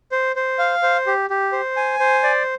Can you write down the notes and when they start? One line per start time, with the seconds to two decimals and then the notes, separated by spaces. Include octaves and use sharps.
0.12 C5
0.36 C5
0.59 F5
0.82 C5
1.07 G4
1.30 G4
1.52 C5
1.77 G#5
1.99 C5
2.23 D5